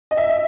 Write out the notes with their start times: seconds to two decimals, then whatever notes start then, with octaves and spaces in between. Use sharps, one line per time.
0.11 D#5
0.17 E5